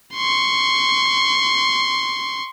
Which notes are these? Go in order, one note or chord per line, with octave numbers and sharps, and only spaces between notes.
C6 C#6